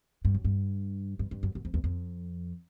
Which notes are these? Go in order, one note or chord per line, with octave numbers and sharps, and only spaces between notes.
G2
F#2
G2
G2
G2
F#2
F#2
F2
E2
F2